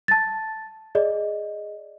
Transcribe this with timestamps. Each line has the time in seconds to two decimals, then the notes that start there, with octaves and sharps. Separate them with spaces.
0.08 A5 A6
0.95 G#4 D5 D#5